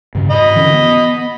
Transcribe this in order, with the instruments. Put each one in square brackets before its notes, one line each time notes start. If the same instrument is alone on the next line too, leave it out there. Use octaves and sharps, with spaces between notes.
[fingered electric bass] G2 C#3
[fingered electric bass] G#2 [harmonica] D#5 B5
[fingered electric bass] D3 E3 C#4
B3